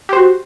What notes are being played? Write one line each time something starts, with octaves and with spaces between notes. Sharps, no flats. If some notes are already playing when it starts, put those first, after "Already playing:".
F#4 G4 C5